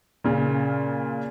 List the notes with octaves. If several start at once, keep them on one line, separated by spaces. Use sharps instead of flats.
A#2 C#3